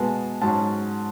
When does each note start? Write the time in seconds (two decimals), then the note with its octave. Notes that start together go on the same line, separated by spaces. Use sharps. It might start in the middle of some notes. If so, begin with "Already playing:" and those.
Already playing: B2 G#3 B3 A5
0.42 G#2 F#3 C#4 A5